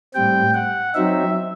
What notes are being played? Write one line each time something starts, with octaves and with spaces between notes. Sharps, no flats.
A2 G3 C4 G5
F#5
F#3 C4 D#4 E5